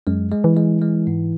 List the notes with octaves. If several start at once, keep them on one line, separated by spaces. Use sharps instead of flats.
F#2 G#3
G#3
E3
G#3
G#3
G#2